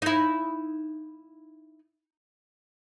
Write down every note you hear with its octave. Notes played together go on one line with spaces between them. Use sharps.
D#4 E4